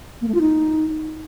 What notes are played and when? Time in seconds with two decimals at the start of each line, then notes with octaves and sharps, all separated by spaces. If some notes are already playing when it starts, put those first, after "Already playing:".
0.22 A#3
0.28 A3
0.34 F4
0.41 D#4